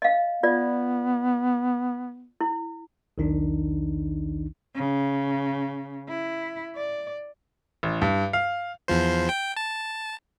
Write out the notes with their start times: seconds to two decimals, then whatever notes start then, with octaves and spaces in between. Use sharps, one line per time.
0.02 D#5 F5
0.43 B3 F4 D5
2.41 E4
3.18 B1 E2 D#3 D4 D#4
4.75 C#3
6.08 E4
6.75 D5
7.83 A1
8.02 G2
8.33 F5
8.88 E2 F3 C5
9.29 G5
9.56 A5